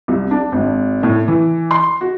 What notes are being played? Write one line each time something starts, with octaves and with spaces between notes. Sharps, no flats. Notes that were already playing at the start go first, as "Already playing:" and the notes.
C2
D4
G#1
A2
E3
C6
F#4